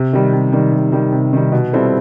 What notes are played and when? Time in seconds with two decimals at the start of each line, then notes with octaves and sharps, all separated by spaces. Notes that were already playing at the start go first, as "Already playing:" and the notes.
Already playing: C3
0.13 D#3 G3
0.33 C3
0.52 D#3 G3
0.72 C3
0.92 D#3 G3
1.12 C3
1.33 D#3 G3
1.52 B2
1.73 G3 C4 E4 A4